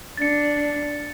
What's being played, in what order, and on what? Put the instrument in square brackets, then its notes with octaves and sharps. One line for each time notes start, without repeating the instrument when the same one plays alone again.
[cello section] D4 [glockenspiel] A6 C#7